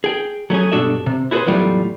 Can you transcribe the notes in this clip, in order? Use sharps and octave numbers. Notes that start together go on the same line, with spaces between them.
G#4 G5
F#3 A3 C#4 G#4
G2 B2 D4 F#4 A4 E5
C3
E4 F#4 G#4 A4 B4 C5
E2 A2 F#3 G3 A3 F4